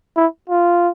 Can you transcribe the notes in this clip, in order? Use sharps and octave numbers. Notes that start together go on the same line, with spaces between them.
E4
F4